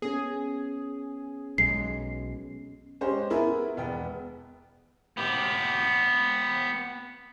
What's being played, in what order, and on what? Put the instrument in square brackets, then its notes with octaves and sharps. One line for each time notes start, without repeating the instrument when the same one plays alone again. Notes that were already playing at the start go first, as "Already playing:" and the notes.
[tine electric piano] B3 C#4 [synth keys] G#4
[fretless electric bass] B1 G#3 [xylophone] C7
[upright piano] G#3 C#4 G4 C5
B3 E4 G#4 A#4 B4
E1 B3 G5
[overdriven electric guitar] B3 G4